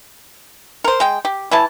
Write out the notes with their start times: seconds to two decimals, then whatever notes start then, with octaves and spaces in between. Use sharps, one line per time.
0.84 A#4 C5
1.00 G#3 G5
1.25 G4
1.51 E3 E4 A5